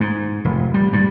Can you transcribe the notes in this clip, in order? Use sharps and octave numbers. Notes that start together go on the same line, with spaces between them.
G#2
F1
G3
G2